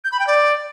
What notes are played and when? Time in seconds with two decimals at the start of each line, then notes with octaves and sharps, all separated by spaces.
0.04 G6
0.12 B5
0.20 G5
0.27 D5